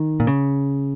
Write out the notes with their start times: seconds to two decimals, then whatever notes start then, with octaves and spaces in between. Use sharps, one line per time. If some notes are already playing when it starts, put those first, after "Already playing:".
Already playing: D#3
0.20 A#2
0.27 C#3